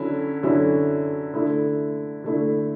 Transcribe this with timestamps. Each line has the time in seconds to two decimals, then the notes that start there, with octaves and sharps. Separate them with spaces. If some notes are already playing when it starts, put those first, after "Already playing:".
Already playing: D3 F#3 C#4 E4
0.43 D3 F#3 C#4 E4
1.34 D3 A3 E4
2.24 D3 A3 E4